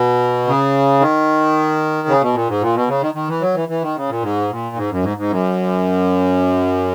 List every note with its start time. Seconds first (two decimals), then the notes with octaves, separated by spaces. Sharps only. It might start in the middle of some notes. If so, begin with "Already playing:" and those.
Already playing: B2
0.47 C#3
1.00 D#3
2.08 C#3
2.21 B2
2.34 A#2
2.48 G#2
2.61 A#2
2.75 B2
2.88 C#3
3.02 D#3
3.14 D#3
3.28 E3
3.41 F#3
3.55 E3
3.69 E3
3.82 D#3
3.96 C#3
4.09 A#2
4.22 G#2
4.50 A#2
4.76 G#2
4.91 F#2
5.03 G#2
5.17 G#2
5.30 F#2